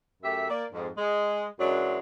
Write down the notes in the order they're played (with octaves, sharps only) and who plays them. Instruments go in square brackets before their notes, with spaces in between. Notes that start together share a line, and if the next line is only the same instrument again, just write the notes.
[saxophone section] F#2 A3 G4 E5
A#3 D5
F2 G#2
G#3
F#2 E3 F#3 G#3 D4